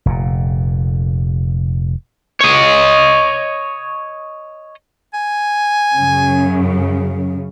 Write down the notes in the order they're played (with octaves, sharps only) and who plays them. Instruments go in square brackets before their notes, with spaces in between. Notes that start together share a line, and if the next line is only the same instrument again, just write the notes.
[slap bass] F1 A#2
[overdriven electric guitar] C#5 D#5
[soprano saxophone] G#5
[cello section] F#2 C#3